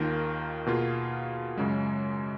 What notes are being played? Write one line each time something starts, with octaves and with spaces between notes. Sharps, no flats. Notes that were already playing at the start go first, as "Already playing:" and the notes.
Already playing: D#2 D#3 A#3 F4 A#4
B2 A#3 F4 G#4
F#2 C#3 G#3